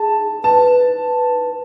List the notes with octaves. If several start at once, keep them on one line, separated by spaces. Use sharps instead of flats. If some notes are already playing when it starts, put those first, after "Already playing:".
Already playing: G#4 A5
B4 A5
B4